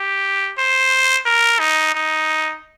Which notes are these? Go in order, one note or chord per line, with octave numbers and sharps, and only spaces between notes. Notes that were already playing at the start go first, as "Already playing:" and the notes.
Already playing: G4
C5
A#4
D#4
D#4